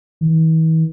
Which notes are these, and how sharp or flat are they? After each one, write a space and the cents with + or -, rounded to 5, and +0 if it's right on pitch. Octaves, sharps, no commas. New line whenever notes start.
E3 -45